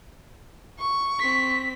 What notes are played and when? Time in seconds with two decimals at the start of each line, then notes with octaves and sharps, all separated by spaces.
0.79 C#6
1.19 C4 B6